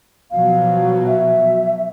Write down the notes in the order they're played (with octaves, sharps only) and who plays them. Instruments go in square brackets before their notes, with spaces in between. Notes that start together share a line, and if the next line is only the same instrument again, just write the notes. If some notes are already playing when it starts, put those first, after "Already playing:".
[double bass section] B2 F3 F#3 [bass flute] F5
[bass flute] E5